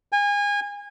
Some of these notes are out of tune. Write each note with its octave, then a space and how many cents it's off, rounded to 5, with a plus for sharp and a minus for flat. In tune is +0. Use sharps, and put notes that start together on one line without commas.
G#5 -30